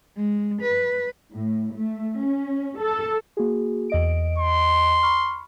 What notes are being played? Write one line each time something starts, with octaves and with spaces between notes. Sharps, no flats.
G#3
B4
A2
A3
C#4
A4
A#3 F#4 G#4
E2 D#5 D7
C6
B5 C#6 F6